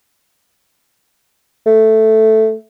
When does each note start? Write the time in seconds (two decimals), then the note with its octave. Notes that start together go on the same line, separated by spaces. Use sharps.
1.66 A3